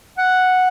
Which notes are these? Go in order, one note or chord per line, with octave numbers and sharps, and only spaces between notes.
F#5